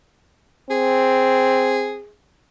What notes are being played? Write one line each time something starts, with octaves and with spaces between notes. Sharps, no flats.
C4 G#4